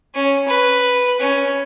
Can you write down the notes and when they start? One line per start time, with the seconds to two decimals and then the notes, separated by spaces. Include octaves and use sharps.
0.15 C#4
0.48 B4
1.20 C#4